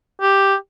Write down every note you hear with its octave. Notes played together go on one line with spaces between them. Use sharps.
G4